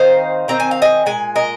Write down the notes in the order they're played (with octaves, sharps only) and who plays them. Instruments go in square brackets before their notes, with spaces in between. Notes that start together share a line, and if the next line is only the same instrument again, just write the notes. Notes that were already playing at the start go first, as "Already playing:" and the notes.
Already playing: [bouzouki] D#3 C4 D#4 C5 F5
D#3 C4 D#4 A#5
G#5
F5
D#5 G#5
A#2 G#3 G#5
A#4 D#5